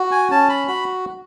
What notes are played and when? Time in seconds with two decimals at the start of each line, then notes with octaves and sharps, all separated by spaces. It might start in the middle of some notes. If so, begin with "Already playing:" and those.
Already playing: F#4
0.11 G#5
0.30 C#4 A5
0.49 B5
0.68 F#4 B5